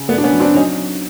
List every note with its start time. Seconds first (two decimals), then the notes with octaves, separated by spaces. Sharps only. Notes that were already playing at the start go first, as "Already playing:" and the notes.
Already playing: C#3
0.09 G2 A3 B3
0.18 D4
0.24 B3 C#4
0.33 F#3
0.40 C4 D4
0.55 F#3 C#4 D#4